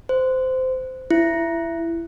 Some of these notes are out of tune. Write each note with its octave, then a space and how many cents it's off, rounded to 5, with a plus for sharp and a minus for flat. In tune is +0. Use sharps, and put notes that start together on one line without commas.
C5 -15
E4 +20